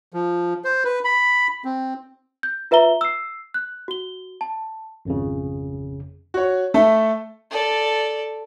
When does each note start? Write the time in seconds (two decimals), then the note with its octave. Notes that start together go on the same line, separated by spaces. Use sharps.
0.14 F3
0.64 C5
0.84 B4
1.04 B5
1.65 C4
2.43 G6
2.71 F4 B4 E5 A#5 G7
3.01 E6 C7
3.54 F#6
3.88 F#4 G7
4.41 A5
5.05 G#1 F2 C#3
6.34 F#4 C#5
6.74 A3 A4 E5
7.51 A4 D5